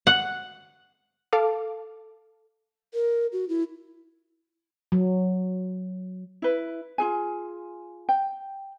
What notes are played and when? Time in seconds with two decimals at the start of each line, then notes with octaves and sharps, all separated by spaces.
0.07 F#5
1.33 A4 F5 A5 D6
2.94 A#4
3.32 F#4
3.49 E4
4.92 F#3
6.42 E4 B4
6.98 F4 G#4 G#5
8.09 G5